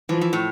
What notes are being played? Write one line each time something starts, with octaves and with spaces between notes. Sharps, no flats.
E3 F3
E3
A2